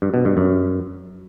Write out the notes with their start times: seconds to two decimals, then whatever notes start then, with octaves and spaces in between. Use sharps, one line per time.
0.02 G2
0.14 B2
0.25 G2
0.37 F#2